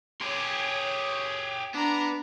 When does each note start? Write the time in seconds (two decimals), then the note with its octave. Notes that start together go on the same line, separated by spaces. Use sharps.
0.21 G4 G#4 C#5 C6
1.74 B3 D4 A#5